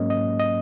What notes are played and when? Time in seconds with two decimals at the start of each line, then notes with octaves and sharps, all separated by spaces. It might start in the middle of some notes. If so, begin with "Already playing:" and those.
Already playing: G#2 F#3 A#3 C#4 D#5
0.10 D#5
0.39 D#5